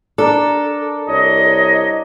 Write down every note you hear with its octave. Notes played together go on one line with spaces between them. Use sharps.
D4 A4 A#4
C2 C#5 D#5